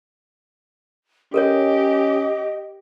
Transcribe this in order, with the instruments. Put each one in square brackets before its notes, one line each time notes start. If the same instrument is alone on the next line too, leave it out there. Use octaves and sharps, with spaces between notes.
[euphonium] C#4 [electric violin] G4 [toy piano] A4 A#4 C#5 [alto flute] D#5